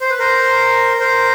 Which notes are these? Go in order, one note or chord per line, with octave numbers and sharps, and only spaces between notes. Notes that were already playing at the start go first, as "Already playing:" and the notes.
C5
B4
A#4 C5
A#4 C5